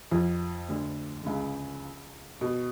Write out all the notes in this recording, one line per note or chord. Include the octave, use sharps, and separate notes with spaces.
F2 F3
D2 D3
D3
C#2 C#3
B2